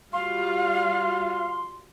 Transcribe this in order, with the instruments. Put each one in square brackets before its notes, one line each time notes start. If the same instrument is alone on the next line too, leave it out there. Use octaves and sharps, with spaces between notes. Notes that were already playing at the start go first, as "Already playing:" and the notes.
[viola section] G3 F4 F#4 [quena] F5 [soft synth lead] C6